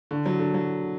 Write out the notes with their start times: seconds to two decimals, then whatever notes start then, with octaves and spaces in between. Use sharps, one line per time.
0.11 D3
0.26 F#3
0.39 D3
0.54 F#3